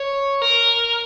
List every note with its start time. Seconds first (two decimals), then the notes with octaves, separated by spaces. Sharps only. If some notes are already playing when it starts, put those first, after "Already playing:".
Already playing: C#5
0.42 A#4